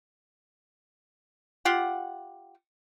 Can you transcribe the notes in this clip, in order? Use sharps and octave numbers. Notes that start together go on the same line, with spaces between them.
F4 G4 F#5